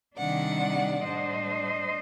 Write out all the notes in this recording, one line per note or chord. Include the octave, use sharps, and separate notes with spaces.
C3 D#3 G3 D4 D5 F#5
A2 G3 D4 C5 D#5